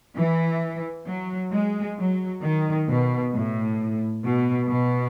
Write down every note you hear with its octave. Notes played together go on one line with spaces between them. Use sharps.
E3
F#3
G#3
F#3
D#3
B2
A2
B2
B2